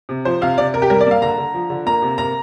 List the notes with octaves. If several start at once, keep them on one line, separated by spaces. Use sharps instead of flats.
C3
F3 C5
C3 F5
C3 D5
C3 A#4
G4
G3 A#4
D5
A#3 F5
D3 A#5
D3
F3
D3
A#3 A#5
C3
A#3 A#5